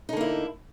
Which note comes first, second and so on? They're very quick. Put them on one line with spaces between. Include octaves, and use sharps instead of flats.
D#4 D3 A#3 E4